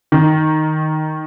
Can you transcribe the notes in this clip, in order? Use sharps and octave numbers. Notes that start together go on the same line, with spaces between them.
D#3